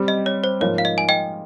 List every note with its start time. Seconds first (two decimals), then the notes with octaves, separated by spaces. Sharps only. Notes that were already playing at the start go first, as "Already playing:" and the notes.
Already playing: G3 C4 G4
0.08 D#5
0.26 C#5
0.44 C5
0.61 G#2 F3 A#3 F4 C#5
0.78 F5
0.85 D#5
0.98 G#5
1.09 D#5 G5